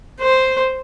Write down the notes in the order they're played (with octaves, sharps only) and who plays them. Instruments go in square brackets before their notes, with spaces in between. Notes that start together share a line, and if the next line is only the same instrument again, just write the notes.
[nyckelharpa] C5